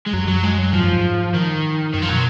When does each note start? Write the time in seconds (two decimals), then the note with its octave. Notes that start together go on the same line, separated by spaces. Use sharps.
0.06 G#3
0.13 F#2 F#3
0.27 F#3
0.43 G#3
0.58 F#3
0.73 G#2 F3
0.83 F#2
0.92 G#2
1.34 D#3
1.94 F#2 D#3
2.02 F3
2.09 B2 F#3